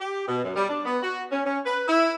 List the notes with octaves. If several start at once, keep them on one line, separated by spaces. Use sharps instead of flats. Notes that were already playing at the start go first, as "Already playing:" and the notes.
G4
B2
F#2
G3
D4
B3
F#4
C#4
C#4
B4
E4